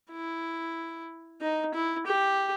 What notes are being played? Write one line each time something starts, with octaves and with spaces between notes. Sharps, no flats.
E4
D#4
E4
G4